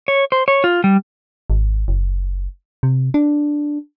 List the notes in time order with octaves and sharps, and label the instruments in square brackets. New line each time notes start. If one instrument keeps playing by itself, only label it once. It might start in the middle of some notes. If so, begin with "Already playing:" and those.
[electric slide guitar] C#5
C5
C#5
F4
G3
[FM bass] G#1
F#1
C3
D4